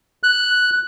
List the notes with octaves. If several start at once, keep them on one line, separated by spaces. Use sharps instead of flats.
F#6